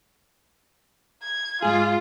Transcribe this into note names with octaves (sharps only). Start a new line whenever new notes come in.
G#6
G#2 F4 G#4